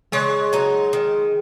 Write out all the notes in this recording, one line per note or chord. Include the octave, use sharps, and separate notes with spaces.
C#3 G#3
F#3 D#4
D#3